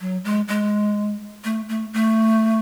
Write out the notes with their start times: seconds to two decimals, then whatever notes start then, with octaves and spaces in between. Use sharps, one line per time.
0.01 F#3
0.24 G#3
0.48 G#3
1.44 A3
1.69 A3
1.93 A3